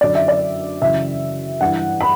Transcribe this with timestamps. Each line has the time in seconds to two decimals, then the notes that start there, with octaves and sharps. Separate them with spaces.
0.01 F#2 D3 D5
0.15 E5
0.28 D5
0.81 F#2 C#3 E3 E5
1.60 G2 E3 F#5
2.01 B5